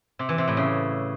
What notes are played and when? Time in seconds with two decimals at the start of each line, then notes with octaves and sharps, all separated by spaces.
0.19 C3
0.29 E3
0.38 C3
0.48 A2
0.57 C#3